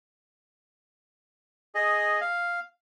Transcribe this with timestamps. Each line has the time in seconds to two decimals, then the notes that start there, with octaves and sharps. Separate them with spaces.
1.75 G#4 D#5
2.21 F5